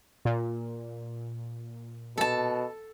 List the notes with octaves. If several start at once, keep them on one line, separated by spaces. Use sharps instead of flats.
A#2
B2 A4 A5